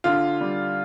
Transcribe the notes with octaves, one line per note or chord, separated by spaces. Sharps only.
D3 F4
G3